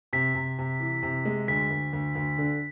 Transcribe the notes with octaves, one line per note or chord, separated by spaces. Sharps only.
C3 B6
C3
C3
E3
C3
G#3
D2 B6
D2
D2
D2
D3